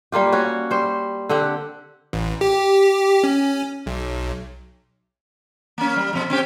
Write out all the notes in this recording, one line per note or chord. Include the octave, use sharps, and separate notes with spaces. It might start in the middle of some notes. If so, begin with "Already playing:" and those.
G3 A#3 F4 G4
C#4 F#4 C#5
G3 C5
D3 C4 G4 F#5
A1
G4
C#4
B1
A#3 C#4
G3
F2 B2
C4 C#4 G4